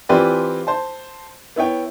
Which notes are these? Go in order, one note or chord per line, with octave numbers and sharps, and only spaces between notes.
E3 C4 F4 G4 B4 D5
C5 A5
B3 E4 C#5 G5